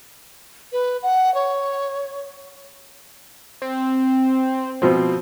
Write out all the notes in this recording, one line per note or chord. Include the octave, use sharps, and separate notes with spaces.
B4
F#5
C#5
C4
B2 F3 C4